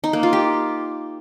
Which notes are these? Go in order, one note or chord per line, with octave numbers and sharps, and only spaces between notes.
D#4
A#3
F4
G4